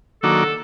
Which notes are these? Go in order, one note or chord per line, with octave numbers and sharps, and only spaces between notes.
D#3 F#3 A#3 D4 F#4 A4